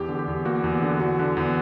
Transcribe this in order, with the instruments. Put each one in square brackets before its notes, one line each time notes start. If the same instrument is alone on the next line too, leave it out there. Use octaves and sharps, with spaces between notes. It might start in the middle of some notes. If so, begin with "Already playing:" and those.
Already playing: [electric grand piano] E2 G4
D3
G4
E2
A#3 F#4
E2
D3
E2 F#4
D3
E2